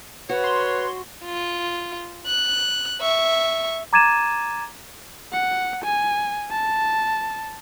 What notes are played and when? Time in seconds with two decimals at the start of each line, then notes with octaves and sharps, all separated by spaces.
0.29 F#4 B4 C#5
0.44 C6
1.25 F4
2.26 F#6
3.01 E5 C#6
3.93 A#5 D6 G#6 A6 D#7 E7
5.33 F#5
5.84 G#5
6.51 A5